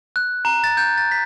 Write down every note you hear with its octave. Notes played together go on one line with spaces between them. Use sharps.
F#6
A#5
A6
G6
A6
B6